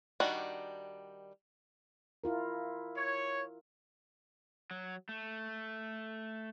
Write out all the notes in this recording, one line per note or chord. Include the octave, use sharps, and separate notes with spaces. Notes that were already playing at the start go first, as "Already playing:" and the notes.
D#3 G3 D4 F#4
E4 F4 A#4
C#5
F#3
A3